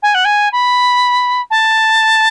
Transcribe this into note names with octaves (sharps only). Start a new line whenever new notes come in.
G#5
F#5
G#5
B5
A5